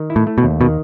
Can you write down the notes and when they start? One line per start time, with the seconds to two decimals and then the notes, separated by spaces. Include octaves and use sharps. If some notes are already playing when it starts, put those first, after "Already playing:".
Already playing: D#3
0.10 E4
0.16 A2
0.27 A3
0.38 B2
0.43 D#2
0.61 B2 D#3